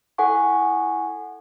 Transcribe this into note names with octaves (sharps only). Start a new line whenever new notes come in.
E4 A4 F#5 G#5 C#6